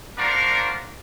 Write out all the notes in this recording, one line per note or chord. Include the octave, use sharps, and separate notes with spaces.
D4 F#4 A#4 C5 D5 F5